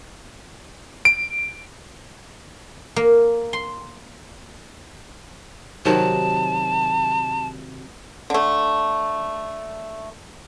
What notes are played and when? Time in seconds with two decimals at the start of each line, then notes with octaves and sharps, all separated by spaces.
1.05 D7
2.96 A#3
3.53 C6
5.85 C3 D#3 F#3 A5
8.30 D3 A3